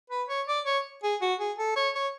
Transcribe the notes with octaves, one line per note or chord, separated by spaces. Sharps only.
B4
C#5
D5
C#5
G#4
F#4
G#4
A4
C#5
C#5